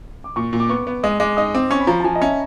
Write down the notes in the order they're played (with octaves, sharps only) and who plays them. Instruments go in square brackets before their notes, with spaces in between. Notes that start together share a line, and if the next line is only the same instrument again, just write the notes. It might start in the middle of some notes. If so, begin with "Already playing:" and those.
[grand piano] D6
[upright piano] A#2 [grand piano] C#6
[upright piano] A#2
[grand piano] D6
[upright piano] B3 [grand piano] C#6
[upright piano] B3
[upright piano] G#3 [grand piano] D#6
[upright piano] G#3 [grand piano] D6
[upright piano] D#4 [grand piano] D#6
[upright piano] C4 [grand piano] D6
[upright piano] C#4 [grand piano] C#6
[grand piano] B5
[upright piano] F3 [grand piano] A#5
[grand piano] A5
[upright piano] F3 [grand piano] G#5
[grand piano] D#5
[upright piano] C#4 [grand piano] E5